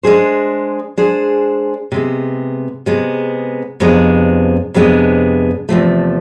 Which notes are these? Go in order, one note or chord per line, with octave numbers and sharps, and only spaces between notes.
G#3 D4 G#4 C5
G#3 D4 G#4 C5
C3 G#3 B3
C3 G#3 B3
F2 C3 G#3 B3 D4
F2 C3 G#3 B3 D4
E2 C3 F3 A3